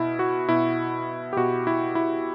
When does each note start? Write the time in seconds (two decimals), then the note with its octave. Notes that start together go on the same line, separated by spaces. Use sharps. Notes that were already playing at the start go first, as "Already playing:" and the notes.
Already playing: B2 E4
0.19 F#4
0.49 B2 E4
1.33 G4
1.36 B2 F#4
1.67 E4
1.95 E4